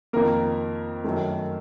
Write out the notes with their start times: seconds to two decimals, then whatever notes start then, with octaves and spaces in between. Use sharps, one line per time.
0.13 F2 D#3 A#3 A#4
1.04 F#2 D#3 A3